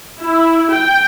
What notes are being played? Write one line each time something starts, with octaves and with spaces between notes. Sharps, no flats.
E4
G5